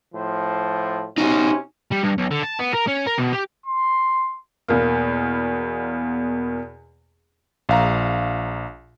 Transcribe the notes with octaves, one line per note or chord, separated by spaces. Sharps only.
A2 F3 C5
C3 C#4 D#4 F#4
G3
G2
B1
D3
A5
B3
A#4
C#4
A#4
B2
G4
C6
E2 B2 A#3
A#1 F5 A#5